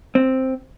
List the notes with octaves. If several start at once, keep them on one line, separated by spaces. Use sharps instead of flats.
C4